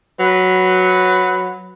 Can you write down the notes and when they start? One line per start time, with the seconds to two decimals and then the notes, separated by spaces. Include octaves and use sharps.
0.20 F#3 B4